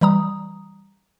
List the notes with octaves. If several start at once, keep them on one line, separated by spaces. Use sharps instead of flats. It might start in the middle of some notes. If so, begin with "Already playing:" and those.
E3 G3 A#5 D#6